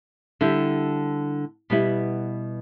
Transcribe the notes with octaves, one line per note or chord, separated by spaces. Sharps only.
D3 G3 E4 G4
B2 G3 B3 E4